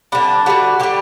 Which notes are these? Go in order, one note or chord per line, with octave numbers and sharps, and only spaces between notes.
D3 G3 D4
D3 G3 F#4
D3 G3 G4